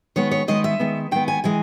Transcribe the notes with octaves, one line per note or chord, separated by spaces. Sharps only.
D#3 G#3 B3 C#5
C#5
D#3 G#3 B3 D#5
E5
D#3 G#3 B3
D#3 G#3 B3 G5
G#5
E3 G#3 G#5